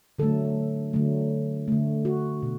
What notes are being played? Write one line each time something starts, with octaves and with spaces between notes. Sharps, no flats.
D3 F#3 A3 A4
D3 F#3 A3
D3 A3
F#4
B2